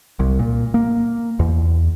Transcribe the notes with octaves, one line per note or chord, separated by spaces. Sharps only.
C2
A#2
A#3
E2